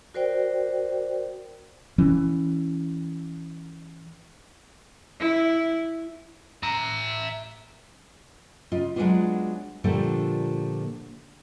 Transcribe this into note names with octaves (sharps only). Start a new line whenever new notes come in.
F#4 A#4 C5 D5 G5
E3 C#4
E4
E5 A#5
C#3 F4 D#5
F#3 G#3 A3 B3 D4 F4
A#2 D3 F3 G3 A3 A#3